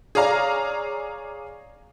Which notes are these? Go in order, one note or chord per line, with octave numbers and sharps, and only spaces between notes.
G#4 C#5 D5 F5 A#5